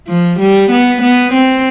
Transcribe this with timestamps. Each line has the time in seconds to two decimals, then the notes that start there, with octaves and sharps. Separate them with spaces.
0.08 F3
0.39 G3
0.71 B3
1.02 B3
1.33 C4